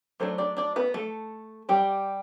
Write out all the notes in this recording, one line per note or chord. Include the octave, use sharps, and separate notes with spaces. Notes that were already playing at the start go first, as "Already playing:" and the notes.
F#3 A3 D4 C5
D4 D5
D4 D5
B3 B4
A3 A4
G3 G4